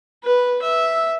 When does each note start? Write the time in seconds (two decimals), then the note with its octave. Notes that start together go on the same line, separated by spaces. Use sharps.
0.24 B4
0.62 E5